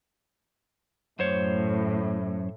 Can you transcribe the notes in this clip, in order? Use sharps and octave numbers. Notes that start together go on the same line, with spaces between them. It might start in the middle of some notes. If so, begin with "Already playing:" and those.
F#2 A2 C5 C#5